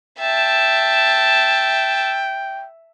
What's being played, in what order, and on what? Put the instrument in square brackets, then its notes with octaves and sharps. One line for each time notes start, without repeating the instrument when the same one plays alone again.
[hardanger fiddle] E5 A5 [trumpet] G5